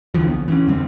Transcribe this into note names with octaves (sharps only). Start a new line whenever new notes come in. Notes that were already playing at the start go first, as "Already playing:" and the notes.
C#2 D3 E3 F3
A#1 B3
E3 B3 C#4
F2 D3 G3 C4